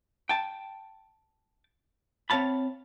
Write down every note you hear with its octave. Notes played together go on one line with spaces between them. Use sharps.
G5 A5
C4 C#5 F5 A5 B5